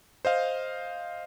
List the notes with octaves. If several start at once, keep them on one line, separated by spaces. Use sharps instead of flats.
C5 D#5 F5